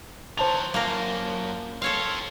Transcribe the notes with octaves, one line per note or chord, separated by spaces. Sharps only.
D#2 F#3 C5 A5 F7
F#2 A#3 F4 A#4
F3 C4 A4 C#5 F5